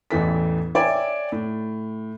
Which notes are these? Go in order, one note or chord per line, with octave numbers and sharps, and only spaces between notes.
A1 E2 E3 A4 B6
C#5 D5 E5 G5 G#5
A2